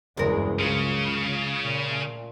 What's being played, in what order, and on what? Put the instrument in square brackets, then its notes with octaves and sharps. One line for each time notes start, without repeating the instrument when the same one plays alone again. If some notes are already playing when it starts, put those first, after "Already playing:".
[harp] F#1 [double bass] E2 G2 [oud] G#3 A#4
[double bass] C#2 [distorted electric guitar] C#3 [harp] F4
[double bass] A#2
[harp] A3